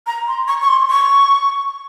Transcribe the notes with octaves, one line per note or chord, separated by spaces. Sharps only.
A#5
C6
C#6
C#6
C6
C#6